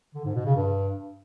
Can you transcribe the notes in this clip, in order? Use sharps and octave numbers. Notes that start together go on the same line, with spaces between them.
D3
G#2
B2
C#3
G2